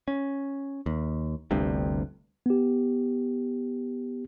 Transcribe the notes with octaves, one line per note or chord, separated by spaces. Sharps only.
C#4
D#2
G1 D2 G2 C3
B3 G4